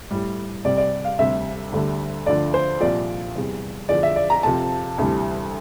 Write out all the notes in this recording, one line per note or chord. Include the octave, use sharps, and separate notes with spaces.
A2 G3
C2 C3 G3 D5
D5
F5
D2 C3 G3 E5
D2 D3 G3
D2 D3 F3 D5
C5
C2 A#2 F3 D5
E2 C3 G3
E2 D3 F3 D5
E5
D5
A#5
F2 C3 F3 A5
D2 C3 E3 G3